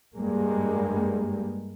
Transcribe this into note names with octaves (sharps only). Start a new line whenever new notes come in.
G2 G3 G#3 A#3